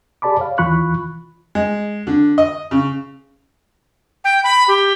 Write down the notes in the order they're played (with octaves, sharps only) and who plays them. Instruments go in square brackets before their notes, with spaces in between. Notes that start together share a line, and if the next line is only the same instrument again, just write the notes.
[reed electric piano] G4 G#4 D5 A5 B5 D6
C#5 F5
D#2 E3 F4 B5 C#6 F#6
[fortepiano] G#3
D3
D#5
C#3
[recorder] G5
B5
G4